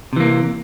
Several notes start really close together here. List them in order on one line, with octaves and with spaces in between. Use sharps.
C3 E3 A#3